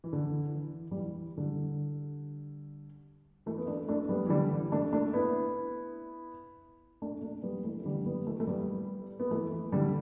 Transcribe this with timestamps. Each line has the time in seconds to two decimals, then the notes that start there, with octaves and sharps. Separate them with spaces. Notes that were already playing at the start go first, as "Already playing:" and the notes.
0.04 E3
0.13 D3
0.54 E3
0.91 G3
0.96 E3
1.38 D3 G3
3.46 E3 A3
3.58 B3
3.67 A3 D4
3.88 A3 D4
4.09 G3 B3
4.26 E3
4.30 D3 G3
4.51 E3
4.72 A3 D4
4.93 A3 D4
5.13 B3 E4
7.02 A3 D4
7.22 A3 D4
7.43 G3 B3
7.64 E3 A3
7.80 E3
7.85 D3 G3
8.06 G3 B3
8.27 E3 A3
8.40 A3
8.47 G3 B3
9.20 B3
9.31 E3 A3
9.52 E3
9.72 D3 G3